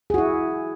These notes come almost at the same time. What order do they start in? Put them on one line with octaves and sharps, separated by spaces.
G#4 F#4 E4